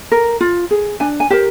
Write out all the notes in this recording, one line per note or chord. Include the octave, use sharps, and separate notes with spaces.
A#4
F4
G#4
D4 G#5
G#5
G4 A#4 C5